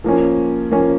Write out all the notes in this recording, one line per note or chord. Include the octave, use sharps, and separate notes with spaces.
F3 A#3 C#4
F3 A#3 C#4